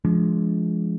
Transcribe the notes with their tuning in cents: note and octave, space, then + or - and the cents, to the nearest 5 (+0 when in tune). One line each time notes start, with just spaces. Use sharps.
F3 -25 G#3 +15 D4 -45